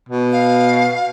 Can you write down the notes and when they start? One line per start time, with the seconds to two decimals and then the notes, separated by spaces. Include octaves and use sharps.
0.09 B2
0.32 F5